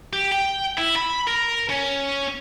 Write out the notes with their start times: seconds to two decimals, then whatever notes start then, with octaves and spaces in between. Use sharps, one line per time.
0.13 G4
0.31 G5
0.77 E4
0.96 B5
1.27 A#4
1.69 C#4